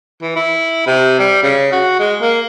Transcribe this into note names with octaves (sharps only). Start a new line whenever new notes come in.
E3
E4
C3
G3
C#3
F#4
G#3
A#3